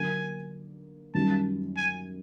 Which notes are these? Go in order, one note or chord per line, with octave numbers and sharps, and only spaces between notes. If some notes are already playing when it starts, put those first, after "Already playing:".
Already playing: D3 F#3 A#3 G#5
F#2 D#3 G3 A5
G#5